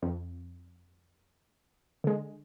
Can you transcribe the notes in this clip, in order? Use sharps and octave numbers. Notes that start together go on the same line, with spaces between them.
F2
D3 G#3